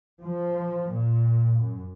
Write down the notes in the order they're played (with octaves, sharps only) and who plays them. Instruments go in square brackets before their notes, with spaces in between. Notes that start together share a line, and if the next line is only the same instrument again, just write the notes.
[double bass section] F3
A#2
F#2